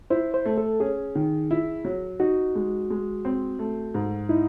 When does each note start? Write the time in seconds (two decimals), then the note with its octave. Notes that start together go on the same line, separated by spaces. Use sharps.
0.10 E4 C5
0.34 C5
0.45 A3
0.58 A4
0.80 C#4 G#4
1.15 D#3
1.51 E4
1.85 F#3
2.19 D#4 F#4
2.55 G#3
2.90 G#3
3.25 C4
3.59 A3
3.94 G#2
4.29 D#4 E4